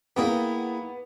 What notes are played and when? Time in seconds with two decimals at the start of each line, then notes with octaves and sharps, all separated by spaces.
0.16 A#3 B3 E4 G#4 A#4 G5